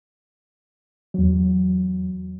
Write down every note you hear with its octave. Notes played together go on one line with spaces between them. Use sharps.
E2 F#3